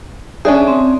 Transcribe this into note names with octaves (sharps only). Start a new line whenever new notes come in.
C#4 D4 G#4 E5
C4